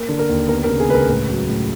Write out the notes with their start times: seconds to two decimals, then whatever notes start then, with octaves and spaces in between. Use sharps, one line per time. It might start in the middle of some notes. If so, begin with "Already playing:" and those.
Already playing: A#3
0.09 D3
0.19 A#4
0.29 D#2
0.49 B3 A#4
0.64 A#4
0.69 C#3
0.80 G#4
0.89 C#2 B4
0.94 A#4
1.09 A2 B4
1.30 F#3
1.49 A2